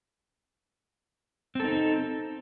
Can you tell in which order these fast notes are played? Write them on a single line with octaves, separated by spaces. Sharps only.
C4 A4 D#4